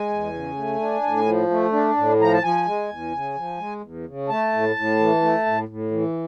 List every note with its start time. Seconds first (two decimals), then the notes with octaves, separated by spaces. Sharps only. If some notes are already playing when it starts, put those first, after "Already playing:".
Already playing: G#3 G#5
0.09 E2
0.34 C#3
0.56 A3
0.80 D4
1.03 A2
1.26 F3
1.50 A3
1.72 D4
1.97 A2
2.19 F3 A#5
2.33 A5
2.43 F3 G#5
2.66 G#3
2.89 E2
3.12 C#3
3.35 F3
3.58 G#3
3.82 E2
4.06 C#3
4.29 A3 A5
4.53 A2
4.76 A2
4.99 E3
5.21 A3
5.46 A2
5.68 A2
5.91 E3